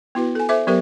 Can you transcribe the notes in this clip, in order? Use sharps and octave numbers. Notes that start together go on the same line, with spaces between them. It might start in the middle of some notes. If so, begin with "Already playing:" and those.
B3 E4 F#4 B4
A4 G#5
A4 C5 E5 D6
F#3 B3 G4 A#4 C5 E5